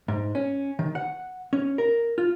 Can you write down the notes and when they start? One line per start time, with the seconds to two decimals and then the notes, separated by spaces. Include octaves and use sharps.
0.08 G#2
0.35 C#4
0.79 D#3
0.95 F#5
1.53 C#4
1.78 A#4
2.18 F4